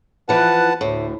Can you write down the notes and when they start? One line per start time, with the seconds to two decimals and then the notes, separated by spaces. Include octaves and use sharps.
0.29 E3 F3 B4 F#5 A5
0.81 D2 A2